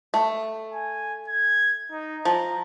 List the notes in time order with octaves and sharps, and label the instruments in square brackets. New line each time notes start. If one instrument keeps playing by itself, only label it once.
[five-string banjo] A3
[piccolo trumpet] G#5
G#6
D#4
[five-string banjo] F3 [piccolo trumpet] A#5